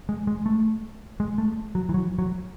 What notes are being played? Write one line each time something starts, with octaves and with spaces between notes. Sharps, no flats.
G#3
G#3
A3
G#3
A3
F#3
E3
F#3
F#3